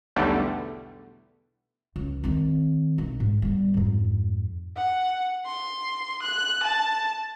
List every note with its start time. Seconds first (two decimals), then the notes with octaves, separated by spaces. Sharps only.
0.16 B1 E2 D3 G3 A3
1.96 C#2
2.24 D#3 C4
2.98 B1
3.20 G#2
3.42 G3 B3
3.74 F2 G#2
4.77 F#5
5.46 C6
6.23 F#6
6.63 A5